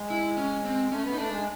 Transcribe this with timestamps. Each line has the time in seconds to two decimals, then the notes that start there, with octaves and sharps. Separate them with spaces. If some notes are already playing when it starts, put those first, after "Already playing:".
Already playing: G#3
0.10 E4
0.37 C#4
0.65 C4
0.92 A3 C#4
1.04 B3
1.13 D#4
1.18 A3 D4
1.31 G#3